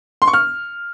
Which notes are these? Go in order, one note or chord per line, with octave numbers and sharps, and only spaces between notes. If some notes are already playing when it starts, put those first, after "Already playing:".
C6
C#6
F6